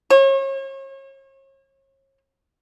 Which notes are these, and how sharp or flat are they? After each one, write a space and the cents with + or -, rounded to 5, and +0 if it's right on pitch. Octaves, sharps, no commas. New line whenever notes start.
C#5 -40